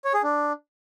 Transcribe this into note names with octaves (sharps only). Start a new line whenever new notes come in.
C#5
G#4
D4